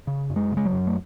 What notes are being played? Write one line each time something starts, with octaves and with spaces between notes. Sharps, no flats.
C#3
F#2
G#3
C#3
G#3
F#3
F#2
A3